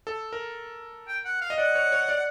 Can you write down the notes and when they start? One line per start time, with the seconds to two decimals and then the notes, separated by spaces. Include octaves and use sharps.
0.07 A4
0.33 A#4
1.08 G5
1.25 F#5
1.41 F5
1.50 D#5
1.58 D5 F#5
1.75 C#5
1.92 C#5
2.09 D5